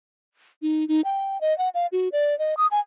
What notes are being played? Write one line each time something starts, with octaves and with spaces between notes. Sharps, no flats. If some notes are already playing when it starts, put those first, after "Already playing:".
D#4
D#4
G5
D#5
F#5
F5
F#4
D5
D#5
D#6
G#5